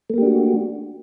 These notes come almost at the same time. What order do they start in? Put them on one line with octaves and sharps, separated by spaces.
A3 A#3 G4 D4 F#4